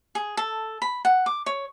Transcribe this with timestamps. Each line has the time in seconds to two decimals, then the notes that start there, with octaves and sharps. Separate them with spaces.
0.15 G#4
0.37 A4
0.82 B5
1.05 F#5
1.26 D6
1.46 C#5